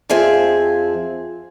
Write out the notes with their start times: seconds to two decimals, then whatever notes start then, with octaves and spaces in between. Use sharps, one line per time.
0.10 F2 F3 C4 G#4 E5